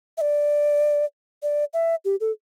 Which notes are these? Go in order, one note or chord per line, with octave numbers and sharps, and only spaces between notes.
E5
D5
D5
E5
G4
A4